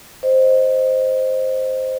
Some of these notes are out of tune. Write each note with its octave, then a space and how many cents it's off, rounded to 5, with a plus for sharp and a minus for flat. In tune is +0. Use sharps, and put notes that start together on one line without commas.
C5 +0 D#5 +0